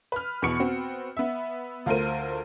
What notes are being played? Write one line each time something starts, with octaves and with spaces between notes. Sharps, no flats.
B4 F6
E2 B2 B5 C#6 C#7
B3 C4 F#4
B3 E5
D2 F4 A4 A#4 C5 D#7